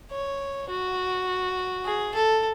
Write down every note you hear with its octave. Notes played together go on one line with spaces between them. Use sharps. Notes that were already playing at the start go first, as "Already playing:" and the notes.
C#5
F#4
G#4
A4